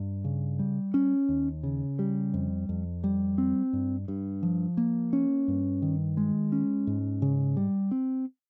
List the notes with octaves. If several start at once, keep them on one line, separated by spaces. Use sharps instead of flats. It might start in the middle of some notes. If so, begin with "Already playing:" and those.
Already playing: G2
C#3
G3
C#4
D#2
C#3
G3
F2
F2
G3
C4
G2
G2
F3
A#3
C#4
G2
D#3
G#3
C#4
G#2
C#3
G3
C4